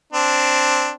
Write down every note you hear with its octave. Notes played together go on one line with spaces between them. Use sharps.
C4 D4